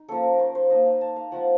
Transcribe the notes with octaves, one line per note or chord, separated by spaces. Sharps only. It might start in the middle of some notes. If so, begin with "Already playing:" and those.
Already playing: D#4
F3 A#3 C#4 A4
A#4
A#4
C5
C5
A#3 D#4 D#5
F5
A5
F5
F3 C4 F4 F#5